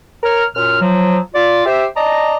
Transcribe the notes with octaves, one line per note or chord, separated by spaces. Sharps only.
A#4 C#5 F6
F#2 A#2 F6
F3 F#3
F4 D5
G4 C5 E5
D5 D#5 A5 A#5